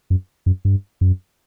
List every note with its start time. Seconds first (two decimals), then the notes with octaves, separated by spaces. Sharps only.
0.10 F#2
0.46 F#2
0.65 G2
1.01 F#2